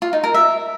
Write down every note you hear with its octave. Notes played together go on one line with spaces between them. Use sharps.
F4
D#4
A#4
E5